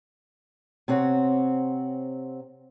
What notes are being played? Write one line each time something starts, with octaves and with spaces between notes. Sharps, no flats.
C3 C4 C#5 F#5